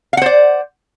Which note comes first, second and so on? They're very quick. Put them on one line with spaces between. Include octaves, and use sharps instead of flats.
F5 F#5 C5 D5